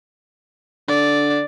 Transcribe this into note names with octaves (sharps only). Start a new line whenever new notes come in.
D3 D5